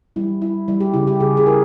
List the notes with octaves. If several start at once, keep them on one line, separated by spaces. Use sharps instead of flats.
G3 E4
G3 E4
G3 E4
G4
C#3 E4
G4
C#3 G#4
G#4
E4 A#4